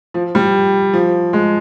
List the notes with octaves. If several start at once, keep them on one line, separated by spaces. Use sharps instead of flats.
F3
G3
F3
G#3